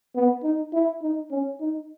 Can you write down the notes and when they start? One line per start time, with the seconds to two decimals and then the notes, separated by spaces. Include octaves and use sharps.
0.15 B3
0.43 D#4
0.73 E4
1.02 D#4
1.31 C#4
1.60 D#4